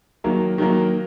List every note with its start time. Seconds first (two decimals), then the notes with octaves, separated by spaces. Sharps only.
0.24 D#3 F#3 A#3
0.58 D#3 F#3 A#3